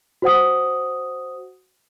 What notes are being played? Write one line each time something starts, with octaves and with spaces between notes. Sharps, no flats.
F#4 C5 F#5 D#6